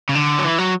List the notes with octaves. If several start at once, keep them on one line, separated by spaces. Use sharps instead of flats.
C#3
D3
F#3
E3
F#3